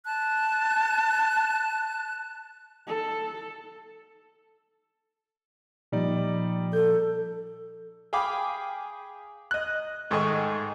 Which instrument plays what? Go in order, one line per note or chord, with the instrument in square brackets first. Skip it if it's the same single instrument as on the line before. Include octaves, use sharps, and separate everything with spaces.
[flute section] A5 F#6
[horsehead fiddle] A4
[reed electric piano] A#2 F3 [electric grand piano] G3 D#4 D5
[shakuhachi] A4 [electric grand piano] G6
[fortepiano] G#4 F5 G5 B5 D6
D#5 F#6
G#2 D#3 A3 G#4 D#5 C#6